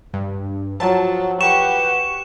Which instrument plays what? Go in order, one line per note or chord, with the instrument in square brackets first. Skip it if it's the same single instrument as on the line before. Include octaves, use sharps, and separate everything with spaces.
[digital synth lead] G2
[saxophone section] F3 [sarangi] F#3 [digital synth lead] A5
[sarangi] G4 [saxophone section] B4 F#5 [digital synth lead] C#6 [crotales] E7